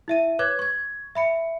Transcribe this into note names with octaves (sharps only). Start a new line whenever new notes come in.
E4 E5 D#7
B4 C#5 D6 F#6 G#6
C#6 G#6
E5 B5 C#7